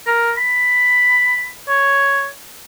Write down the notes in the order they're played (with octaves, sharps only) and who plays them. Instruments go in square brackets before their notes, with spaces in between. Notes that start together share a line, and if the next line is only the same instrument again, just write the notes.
[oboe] A#4
B5
C#5